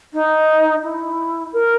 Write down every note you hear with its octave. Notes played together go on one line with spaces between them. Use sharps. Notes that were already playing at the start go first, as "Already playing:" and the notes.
D#4
E4
A#4